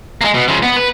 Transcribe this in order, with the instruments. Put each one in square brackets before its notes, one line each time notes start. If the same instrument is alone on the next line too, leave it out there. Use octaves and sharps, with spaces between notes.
[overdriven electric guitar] G#3 A#3
B2
C#3 F3
B3
B4